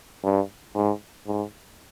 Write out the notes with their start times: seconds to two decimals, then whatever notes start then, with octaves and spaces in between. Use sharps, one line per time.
0.24 G2
0.75 G#2
1.27 G#2